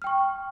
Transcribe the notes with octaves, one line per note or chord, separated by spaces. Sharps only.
G5 C#6 F6